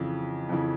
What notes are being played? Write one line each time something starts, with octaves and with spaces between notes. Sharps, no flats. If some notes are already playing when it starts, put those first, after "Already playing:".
Already playing: F2 C#3 E3
F2 C#3 E3